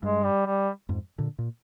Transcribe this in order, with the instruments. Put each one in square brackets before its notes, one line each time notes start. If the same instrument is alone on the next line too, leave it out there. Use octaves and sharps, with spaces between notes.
[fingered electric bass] G2 [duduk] G#3
[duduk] G3
G3
[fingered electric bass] F2 G#2
A#2 D3
A#2